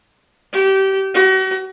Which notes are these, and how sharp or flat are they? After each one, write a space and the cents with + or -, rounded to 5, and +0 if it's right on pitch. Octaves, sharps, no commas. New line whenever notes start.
G4 -25
F#4 +40